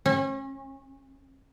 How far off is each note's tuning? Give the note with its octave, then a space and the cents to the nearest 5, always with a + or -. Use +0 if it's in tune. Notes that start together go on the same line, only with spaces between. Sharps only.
C#4 -35